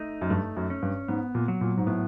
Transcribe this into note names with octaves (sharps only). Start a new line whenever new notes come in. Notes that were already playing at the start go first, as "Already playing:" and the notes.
Already playing: A3 D#4
F#2
G2 A3
F#2
C#4
G2
G#2 B3
A#2
F#3
A#2
G#2
A2 B3